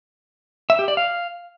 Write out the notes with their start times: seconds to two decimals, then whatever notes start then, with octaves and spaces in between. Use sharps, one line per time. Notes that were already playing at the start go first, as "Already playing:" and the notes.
0.70 E5
0.79 G4
0.88 D5
0.97 F5